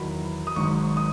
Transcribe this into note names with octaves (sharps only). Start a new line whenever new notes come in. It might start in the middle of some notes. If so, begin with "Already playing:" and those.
Already playing: E2 D#3 F#3 B5
D#6
G#1 G#2 F#3 C#6
D#6